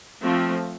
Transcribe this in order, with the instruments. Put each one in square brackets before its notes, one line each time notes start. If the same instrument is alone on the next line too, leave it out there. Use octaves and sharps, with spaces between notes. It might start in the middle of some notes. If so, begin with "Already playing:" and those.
[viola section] F3 A3 C4